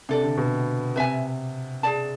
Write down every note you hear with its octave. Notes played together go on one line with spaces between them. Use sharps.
C3 D4 A4 D5
D3
B2
C3 B4 E5 G#5
G#4 D5 A5